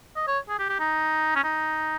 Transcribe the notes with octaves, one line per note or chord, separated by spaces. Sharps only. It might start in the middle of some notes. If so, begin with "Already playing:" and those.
D#5
C#5
G#4
G4
G4
D#4
C#4
D#4